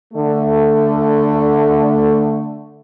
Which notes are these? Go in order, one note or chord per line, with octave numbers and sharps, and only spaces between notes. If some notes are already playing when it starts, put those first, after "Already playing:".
D3 A3